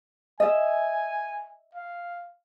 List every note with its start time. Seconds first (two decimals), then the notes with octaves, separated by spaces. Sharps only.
0.40 D#5 E5 G#5
1.75 F5